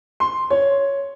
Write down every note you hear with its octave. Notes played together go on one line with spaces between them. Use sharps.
C6
C#5